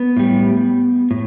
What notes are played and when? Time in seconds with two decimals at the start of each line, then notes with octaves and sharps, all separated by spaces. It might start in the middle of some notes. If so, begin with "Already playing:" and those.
Already playing: B3
0.17 A2 G3
1.11 A2